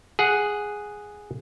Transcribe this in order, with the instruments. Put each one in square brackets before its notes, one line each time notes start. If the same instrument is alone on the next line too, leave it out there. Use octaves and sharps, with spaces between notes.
[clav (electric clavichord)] G#4 F#5